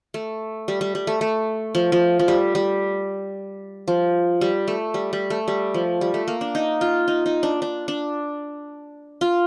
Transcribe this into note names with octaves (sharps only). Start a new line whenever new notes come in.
A3
G3
G3
G3
A3
A3
F3
F3
F3
G3
G3
F3
G3
A3
G3
G3
A3
G3
F3
G3
A3
A#3
D4
D#4
F4
D#4
D#4
D4
D4
D4
F4